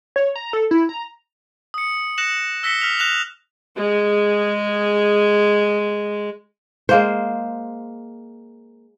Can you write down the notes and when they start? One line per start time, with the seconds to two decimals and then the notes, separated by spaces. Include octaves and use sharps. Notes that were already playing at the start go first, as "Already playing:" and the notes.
0.16 C#5
0.36 A#5
0.53 A4
0.71 E4
0.89 A#5
1.74 D#6 C#7
2.18 F#6 A#6 C#7 E7 F#7
2.63 E6 A#6 B6 C#7 G7
2.81 F6 B6 F7
2.99 F#6 A#6 E7 F7
3.76 G#3 G#4
6.89 G#3 A#3 C5